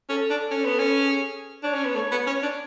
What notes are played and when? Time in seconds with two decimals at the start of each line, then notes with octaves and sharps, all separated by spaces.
0.09 C#4 A4
0.30 D4
0.40 A4
0.51 C#4
0.64 B3
0.72 A4
0.79 C#4
1.03 G#4
1.63 D4 C#5
1.74 C#4
1.84 B3
1.95 A3 C#5
2.11 B3
2.27 C#4 C#5
2.43 D4